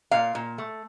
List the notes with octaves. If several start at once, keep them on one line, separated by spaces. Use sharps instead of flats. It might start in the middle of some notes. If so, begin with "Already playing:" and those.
A#2 F5
A#2
A3